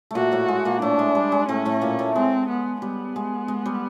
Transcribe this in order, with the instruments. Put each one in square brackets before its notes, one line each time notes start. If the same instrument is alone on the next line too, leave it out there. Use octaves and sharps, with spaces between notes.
[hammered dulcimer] A#2 A3 A#3 [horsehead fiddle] F#4
[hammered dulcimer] A2 A3
G#3
A#2 A#3
[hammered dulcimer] A2 A3 [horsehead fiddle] D4
[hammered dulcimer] G#3
G3
G#3
[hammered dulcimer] A2 A3 [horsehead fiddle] C#4
[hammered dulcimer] A2 A3
A#2 A#3
A2 A3
[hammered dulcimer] G#3 [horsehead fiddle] C4
[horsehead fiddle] B3
[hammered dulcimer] G3 [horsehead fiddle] B3
[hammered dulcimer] G#3
G#3
G3